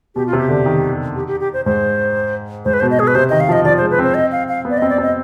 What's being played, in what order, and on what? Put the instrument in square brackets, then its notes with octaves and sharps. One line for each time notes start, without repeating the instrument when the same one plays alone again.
[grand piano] B2 [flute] G4
[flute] F4
[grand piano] C3 [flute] G4
[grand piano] D3
D#3
[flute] G4
G4
G4
C5
[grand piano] G#2 [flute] C5
[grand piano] G#2 [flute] C5
[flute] B4
[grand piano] B2 [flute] C5
[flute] D#5
[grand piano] B2 [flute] G#4
[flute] B4
[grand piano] C3 [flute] C5
[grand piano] D#3 [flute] D#5
[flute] F5
[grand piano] F3 [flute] D#5
[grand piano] F3 [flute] D5
[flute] C5
[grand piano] G#3
[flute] B4
[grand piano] C4 [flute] C5
[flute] D#5
F5
F5
[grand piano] B3
[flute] D5
D#5
[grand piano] C4
[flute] D5
[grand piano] C4 [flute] D#5